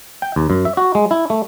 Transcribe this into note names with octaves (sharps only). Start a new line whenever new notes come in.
G5
D#2
F#2
E5
F#4
G#3
E4
A3